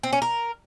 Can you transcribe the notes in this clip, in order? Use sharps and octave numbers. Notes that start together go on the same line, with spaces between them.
C4
C#4
A#4